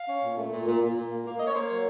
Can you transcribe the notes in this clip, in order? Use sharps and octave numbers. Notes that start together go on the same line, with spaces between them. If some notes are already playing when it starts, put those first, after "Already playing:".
Already playing: F5
C#4
A#2
A3
A#2
A#2
A#2
A#2
A#3
A#3
A#3 D#5
C#5
A#3 C5
C#5
F#3